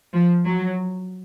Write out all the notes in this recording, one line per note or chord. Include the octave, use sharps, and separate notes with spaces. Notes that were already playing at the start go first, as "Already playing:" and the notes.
F3
F#3